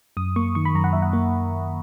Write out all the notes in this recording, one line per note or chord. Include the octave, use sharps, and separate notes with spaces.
F#2 D#6
A#3 C#6
D#3 C#6
B5
F#2 A#5
F#5
F#2 E5
F#5
A#3